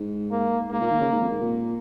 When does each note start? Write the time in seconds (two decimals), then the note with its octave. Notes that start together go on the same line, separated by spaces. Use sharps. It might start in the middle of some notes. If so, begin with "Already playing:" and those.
Already playing: G#2
0.32 A#3
0.71 G#2 A#3
0.81 A#2
0.91 D#3
1.01 C#3
1.11 G#2
1.22 F2
1.32 G#2
1.41 A#2